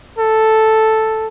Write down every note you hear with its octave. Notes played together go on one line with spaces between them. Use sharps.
A4